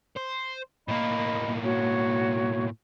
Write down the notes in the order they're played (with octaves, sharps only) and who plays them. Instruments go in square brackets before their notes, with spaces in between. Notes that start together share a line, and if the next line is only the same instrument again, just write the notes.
[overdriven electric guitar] C5
[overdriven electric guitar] A2 A#3 [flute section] D#5 B5
[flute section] F#4 C#5